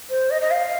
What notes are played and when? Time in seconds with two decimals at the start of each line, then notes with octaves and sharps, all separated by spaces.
0.10 C5
0.31 D#5
0.42 D#5
0.51 F5